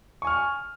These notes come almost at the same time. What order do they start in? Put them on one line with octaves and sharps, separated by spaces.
C#6 G#5 F6